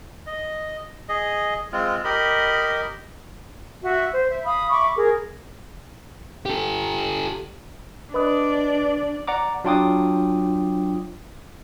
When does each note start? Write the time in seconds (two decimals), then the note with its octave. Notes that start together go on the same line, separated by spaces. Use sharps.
0.26 D#5
1.09 G#4 D#5
1.72 G#3 C4 F4
2.04 G4 A#4 D#5 B5
3.83 F#4 E5
4.13 C5
4.30 E5
4.45 F5 B5 D#6
4.70 E5 B5 C#6 D6
4.96 G#4 A#4
6.46 G4 A4
8.14 D4 B4 D5 D#5
9.27 D5 F#5 A#5 D6
9.64 F#3 D4 F4 G5 D6 D#6